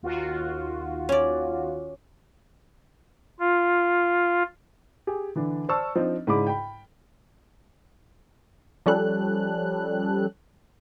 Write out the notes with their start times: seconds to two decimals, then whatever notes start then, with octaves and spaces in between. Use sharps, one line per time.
0.03 D#2 F4 F#4
1.09 C#4 D5
3.40 F4
5.07 G4 G#4
5.36 D3 E3 D4
5.69 C5 D5 A5 C#6 E6 F6
5.95 F3 C4 D4 D#4
6.27 G#2 C#3 E4 D5 B5 D6
6.47 G5 B5
8.86 F3 G3 C#4 A4 F#6